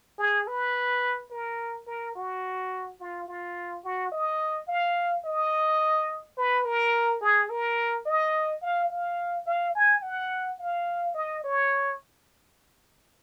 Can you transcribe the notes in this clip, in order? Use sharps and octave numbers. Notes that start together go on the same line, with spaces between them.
G#4
B4
A#4
A#4
F#4
F4
F4
F#4
D#5
F5
D#5
B4
A#4
G#4
A#4
D#5
F5
F5
F5
G#5
F#5
F5
D#5
C#5